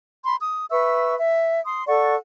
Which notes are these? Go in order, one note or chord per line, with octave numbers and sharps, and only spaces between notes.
B5 C6
D#6
B4 E5 C#6 E6
E5
C6 D#6
A4 D5 F#5 C#6